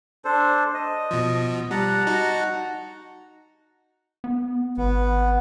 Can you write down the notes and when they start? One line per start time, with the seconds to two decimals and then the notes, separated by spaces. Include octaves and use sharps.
0.25 D4 A4 C5
0.74 D#5
1.11 B2 F3
1.71 G3 F#5 A5 A#5
2.07 D#4 F#4
4.24 B3
4.78 G#1 B3